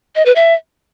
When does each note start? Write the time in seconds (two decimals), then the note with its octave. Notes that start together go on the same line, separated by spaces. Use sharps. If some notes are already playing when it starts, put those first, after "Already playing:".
0.16 D#5
0.26 B4
0.36 E5